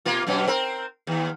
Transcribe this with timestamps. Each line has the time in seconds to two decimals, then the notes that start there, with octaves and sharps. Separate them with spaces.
0.05 B2 A#3 F4
0.27 F#2 B2 C#4
0.47 C4 A#4
1.07 D#2